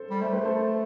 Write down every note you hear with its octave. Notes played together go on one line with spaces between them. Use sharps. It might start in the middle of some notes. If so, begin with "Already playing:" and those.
Already playing: A4 C5
G3
A3 C5
B4
A4 C5